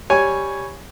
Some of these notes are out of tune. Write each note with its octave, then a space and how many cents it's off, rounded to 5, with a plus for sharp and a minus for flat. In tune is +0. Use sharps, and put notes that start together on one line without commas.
G3 +0 C#5 +0 G#5 +0